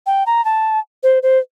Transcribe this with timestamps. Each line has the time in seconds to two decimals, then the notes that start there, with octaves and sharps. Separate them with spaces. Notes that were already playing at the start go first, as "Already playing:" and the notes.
0.06 G5
0.26 A#5
0.45 A5
1.03 C5
1.23 C5